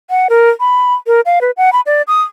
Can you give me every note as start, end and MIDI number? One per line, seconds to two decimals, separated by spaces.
0.10 0.27 78
0.30 0.50 70
0.60 0.94 83
1.07 1.21 70
1.26 1.39 77
1.41 1.51 71
1.57 1.73 78
1.73 1.81 83
1.86 2.02 74
2.08 2.22 87